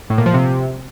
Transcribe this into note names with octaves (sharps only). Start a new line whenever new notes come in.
A2
A#2
F3
C3